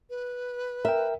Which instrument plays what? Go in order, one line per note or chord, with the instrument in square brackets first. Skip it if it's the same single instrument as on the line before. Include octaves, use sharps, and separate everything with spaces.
[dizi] B4
[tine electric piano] A#4 G5 [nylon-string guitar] E5